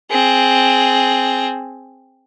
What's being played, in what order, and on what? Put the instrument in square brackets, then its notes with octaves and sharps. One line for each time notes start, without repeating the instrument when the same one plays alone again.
[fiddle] C4 G#4